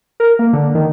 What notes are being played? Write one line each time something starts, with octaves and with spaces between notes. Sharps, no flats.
A#4
A#3
D3
D#3